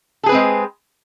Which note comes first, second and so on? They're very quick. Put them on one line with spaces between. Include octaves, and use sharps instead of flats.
A4 G#4 B4 C4 G#3